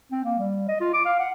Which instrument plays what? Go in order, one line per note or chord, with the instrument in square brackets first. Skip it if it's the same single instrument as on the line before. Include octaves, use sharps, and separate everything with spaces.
[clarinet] C4
A#3
G3
D#5
F4
D6
F5
F#5